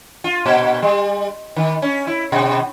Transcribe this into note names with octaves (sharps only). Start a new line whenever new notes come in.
F4
A#2
G3
D#3
C#4
E4
B2